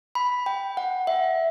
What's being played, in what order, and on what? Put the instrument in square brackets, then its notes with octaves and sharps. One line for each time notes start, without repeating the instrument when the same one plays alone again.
[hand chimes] B5
G5
F#5
E5